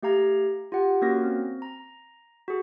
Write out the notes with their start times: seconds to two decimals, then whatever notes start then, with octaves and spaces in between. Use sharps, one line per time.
0.02 A3 G4 F5 A#5 G#6
0.72 F4 G4 F#5
1.02 A#3 C#4 F#4 A#4 A#6
1.24 C4
1.62 A#5
2.48 F#4 G#4